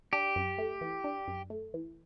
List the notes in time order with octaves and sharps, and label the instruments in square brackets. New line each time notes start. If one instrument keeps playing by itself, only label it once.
[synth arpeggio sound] D4 [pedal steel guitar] G4
[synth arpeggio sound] F#2
A3
E3
D4
F#2
A3
E3